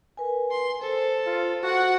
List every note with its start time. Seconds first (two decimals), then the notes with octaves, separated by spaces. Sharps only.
0.17 A#4 B4 G#5
0.51 C6
0.81 A4 C5
1.27 F4
1.63 F#4 F#5